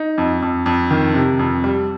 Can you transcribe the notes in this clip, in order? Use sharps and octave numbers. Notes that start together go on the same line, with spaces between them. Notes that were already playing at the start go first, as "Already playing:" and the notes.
Already playing: D#4
F2
F2
F2
D#3
C3
F2
G3